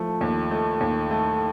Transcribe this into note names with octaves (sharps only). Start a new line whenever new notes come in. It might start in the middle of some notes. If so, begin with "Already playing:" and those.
Already playing: F3 A3
D#2
A3
D#2
A3